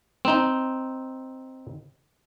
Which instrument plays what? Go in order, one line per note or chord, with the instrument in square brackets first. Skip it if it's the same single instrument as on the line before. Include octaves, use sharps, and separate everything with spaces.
[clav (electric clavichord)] C4 D#4